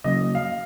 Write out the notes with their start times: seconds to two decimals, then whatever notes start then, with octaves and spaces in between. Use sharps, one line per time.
0.04 C#3 F#3 A#3 D#5
0.35 F5